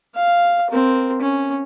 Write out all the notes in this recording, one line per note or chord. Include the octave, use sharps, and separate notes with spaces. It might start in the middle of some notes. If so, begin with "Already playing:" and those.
F5
C4 A#4
C#4